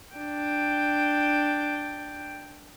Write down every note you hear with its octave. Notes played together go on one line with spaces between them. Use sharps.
D4 G5